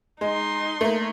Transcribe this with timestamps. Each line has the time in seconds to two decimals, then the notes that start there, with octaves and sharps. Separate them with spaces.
0.21 G#3 D#4 C6
0.81 A3 A#3